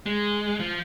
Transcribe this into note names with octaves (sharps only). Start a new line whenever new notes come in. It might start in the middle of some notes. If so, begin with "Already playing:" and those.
G#3
F3